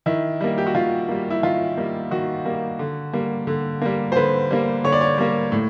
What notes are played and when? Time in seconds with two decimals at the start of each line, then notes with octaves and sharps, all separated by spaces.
0.06 D#3 E4
0.41 G3 A#3
0.58 G4
0.67 F#4
0.75 D#3 F4
1.08 G3 A#3
1.30 E4
1.43 D#3 F4
1.77 G3 A#3
2.11 D#3 F#4
2.45 G3 A#3
2.79 D3
3.13 G3 A#3
3.47 D3
3.81 G3 A#3
4.12 C5
4.16 D3 B4
4.51 G3 A#3
4.84 D3 C#5
4.92 D5
5.01 C#5
5.18 G3 A#3
5.52 A2